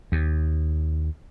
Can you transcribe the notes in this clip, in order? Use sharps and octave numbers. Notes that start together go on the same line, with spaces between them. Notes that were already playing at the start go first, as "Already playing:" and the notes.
D#2